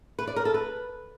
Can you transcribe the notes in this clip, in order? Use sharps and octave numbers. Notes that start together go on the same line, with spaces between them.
B4
D5
A#4
A4
B4